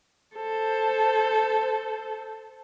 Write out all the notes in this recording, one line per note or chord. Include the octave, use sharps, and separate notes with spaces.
A4 C5